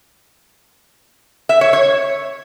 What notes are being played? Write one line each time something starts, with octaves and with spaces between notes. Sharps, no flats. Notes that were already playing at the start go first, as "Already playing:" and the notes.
E5
C#5
C#5